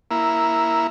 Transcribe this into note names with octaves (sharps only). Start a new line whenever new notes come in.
A#3 E4